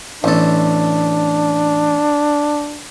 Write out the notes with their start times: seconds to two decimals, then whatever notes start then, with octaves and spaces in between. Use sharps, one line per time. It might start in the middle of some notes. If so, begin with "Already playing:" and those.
0.24 A1 D4 A4